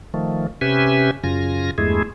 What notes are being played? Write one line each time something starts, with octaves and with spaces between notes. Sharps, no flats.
D#3 F3 A3
C3 C#4 G4 B4 E5 G#5
F#2 C#3 F4 G#5 A#6
E2 G2 G#3 A3 E4 G#4